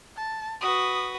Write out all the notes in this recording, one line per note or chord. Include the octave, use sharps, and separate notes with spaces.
A5
F#4 B4 D#6